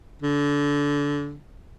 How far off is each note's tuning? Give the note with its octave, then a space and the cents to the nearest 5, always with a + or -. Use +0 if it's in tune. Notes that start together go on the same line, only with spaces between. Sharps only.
D3 -25